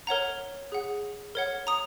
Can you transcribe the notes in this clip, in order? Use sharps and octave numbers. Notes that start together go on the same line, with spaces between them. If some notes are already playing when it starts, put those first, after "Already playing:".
A#4 C#5 F#5 A#5
G#4 F#5
A#4 C#5 F#5
A#5 D#6